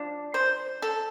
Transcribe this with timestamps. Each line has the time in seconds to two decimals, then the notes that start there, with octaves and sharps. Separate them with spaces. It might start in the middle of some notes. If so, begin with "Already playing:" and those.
Already playing: F3 D4
0.34 C5
0.82 A4